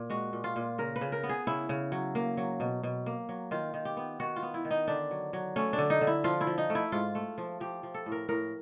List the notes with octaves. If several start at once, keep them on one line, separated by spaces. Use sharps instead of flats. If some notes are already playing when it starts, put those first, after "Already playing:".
Already playing: A#2
G#3 F#4
A#2
F4
A#2
C#3 A#4
B4
C#3
A#4
B3
G#4
C#3 E4
C#3
F#3
A#3
F#3
B2
B2
A#3
F#3
D#3 F4
D#3
G4
B3
D#3 F#4
F4
B3
E4
D#3
D#4
D3 D4
F#3
F#3
A3 C#4
D4
D3
D#4
D3
E4
F3 F4
E4
F3
D#4
A3
E4
G#2 F4
A3
F3
F3 G4
F3
A4
A2
A#4
A2 A#4